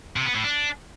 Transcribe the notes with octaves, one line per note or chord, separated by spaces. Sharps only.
C3
B3
A2
D4